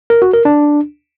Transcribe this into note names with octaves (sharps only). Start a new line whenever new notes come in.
A#4
F#4
A#4
D4